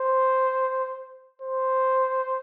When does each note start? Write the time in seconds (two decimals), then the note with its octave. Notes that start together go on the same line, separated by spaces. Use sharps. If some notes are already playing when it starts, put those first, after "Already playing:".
Already playing: C5
1.42 C5